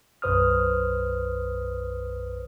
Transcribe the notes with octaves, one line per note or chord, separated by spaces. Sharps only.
B1 F#2 B4 C5 D#6 F6